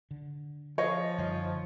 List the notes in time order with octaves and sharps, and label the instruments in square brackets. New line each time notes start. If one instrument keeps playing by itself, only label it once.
[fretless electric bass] D3
[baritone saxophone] F3 [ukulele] G#4 D#5 F5 [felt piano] C#5
[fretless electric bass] F#2 D3 G3 [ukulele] C#4 D#4 F4